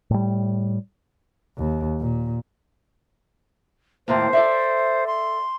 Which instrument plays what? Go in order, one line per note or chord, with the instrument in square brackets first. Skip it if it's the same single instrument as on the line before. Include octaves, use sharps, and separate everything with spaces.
[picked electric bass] A2 G3
[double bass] D#2
A#2
[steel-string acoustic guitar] D#2 A2 A#3 [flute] C5
[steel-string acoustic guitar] A4 D5 E5
[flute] C6